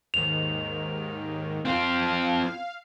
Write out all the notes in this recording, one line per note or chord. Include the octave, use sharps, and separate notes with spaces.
D#2 G#2 D#3 F7
C4 F4 F5